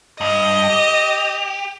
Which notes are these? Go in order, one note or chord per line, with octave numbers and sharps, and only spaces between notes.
G2 D#5
G4